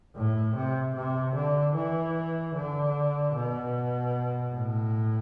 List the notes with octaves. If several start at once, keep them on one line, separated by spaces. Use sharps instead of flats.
A2
C3
C3
D3
E3
D3
B2
A2